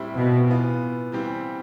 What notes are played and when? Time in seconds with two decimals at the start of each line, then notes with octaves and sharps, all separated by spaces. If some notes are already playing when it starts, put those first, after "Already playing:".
Already playing: A2 G3 C4 E4 G4
0.16 B2
0.47 E3 B3 F4
1.12 E3 G3 C4 G4